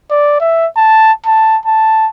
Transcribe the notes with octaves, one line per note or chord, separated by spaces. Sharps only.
D5
E5
A5
A5
A5